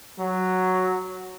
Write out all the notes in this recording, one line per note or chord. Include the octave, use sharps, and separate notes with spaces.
F#3